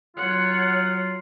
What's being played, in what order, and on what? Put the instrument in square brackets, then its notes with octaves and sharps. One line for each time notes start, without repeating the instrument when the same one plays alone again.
[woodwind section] F#3 F4 [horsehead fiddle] C#5 F#5